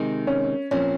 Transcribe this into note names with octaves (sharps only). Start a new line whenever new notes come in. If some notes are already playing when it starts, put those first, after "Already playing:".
Already playing: C3 D#3 G#3 D#4
C#4
A#2 F3 C4 C#4